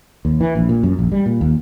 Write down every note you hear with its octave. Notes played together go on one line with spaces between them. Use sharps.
D#2
E3
A#1
A#2
F#2
A#1
G3
A#2
D#2